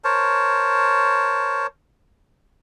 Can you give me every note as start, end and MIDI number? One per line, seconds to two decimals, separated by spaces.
0.04 1.67 70
0.04 1.67 72
0.04 1.67 73
0.04 1.67 81